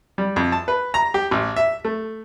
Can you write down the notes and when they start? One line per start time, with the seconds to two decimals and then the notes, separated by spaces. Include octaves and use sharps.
0.18 G3
0.36 F2
0.52 A5
0.68 B4
0.94 A#5
1.14 G4
1.31 A1
1.56 E5
1.85 A3